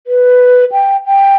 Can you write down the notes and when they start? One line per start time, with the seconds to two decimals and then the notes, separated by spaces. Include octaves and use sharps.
0.07 B4
0.72 G5
1.06 G5